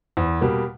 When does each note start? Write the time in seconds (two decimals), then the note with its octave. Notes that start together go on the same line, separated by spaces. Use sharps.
0.17 E2
0.41 B2 G3 A#3